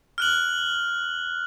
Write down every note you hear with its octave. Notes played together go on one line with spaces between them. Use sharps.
F6 F#6 F#7